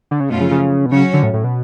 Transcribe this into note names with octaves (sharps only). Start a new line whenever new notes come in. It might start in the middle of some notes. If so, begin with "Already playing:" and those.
D3
C#3
F#2 B2 F3 A3 C#4 F4
C#3
C#3
B2
C#3 F#3 C#4 F#4 C#5
D3
A2
A2
B2